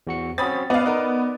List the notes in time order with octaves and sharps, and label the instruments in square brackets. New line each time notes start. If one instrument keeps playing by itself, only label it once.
[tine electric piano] E2 F#4 C#7
[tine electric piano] C4 C#4 F#4 [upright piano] B5 D#6 A6
[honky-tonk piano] B3 [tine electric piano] D5 [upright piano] D#5 F5
[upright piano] D#4 A#4